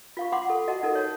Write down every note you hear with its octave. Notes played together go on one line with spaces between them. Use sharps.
F4 F5 C#6
F#5 B5 C6 D6
A4
F#4 D#5 F#5 A5
D#4 A4 A#4
C#5 A5